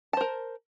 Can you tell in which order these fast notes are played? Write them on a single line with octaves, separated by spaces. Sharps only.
A5 C5 A#4